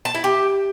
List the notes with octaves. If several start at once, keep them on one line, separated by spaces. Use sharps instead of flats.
A5
E4
G4